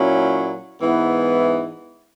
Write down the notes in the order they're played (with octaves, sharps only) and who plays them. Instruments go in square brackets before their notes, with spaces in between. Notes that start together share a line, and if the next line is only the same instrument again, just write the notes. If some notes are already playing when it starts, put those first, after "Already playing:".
Already playing: [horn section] A#2 F#3 C#4 E4
G#2 E3 B3 E4